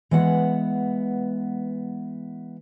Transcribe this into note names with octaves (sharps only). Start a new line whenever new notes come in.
E3 G#3 B3 F#5